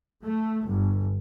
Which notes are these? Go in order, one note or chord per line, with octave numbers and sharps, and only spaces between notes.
A3
G1